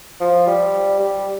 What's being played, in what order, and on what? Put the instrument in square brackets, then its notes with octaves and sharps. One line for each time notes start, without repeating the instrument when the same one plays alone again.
[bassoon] F3
G3
G3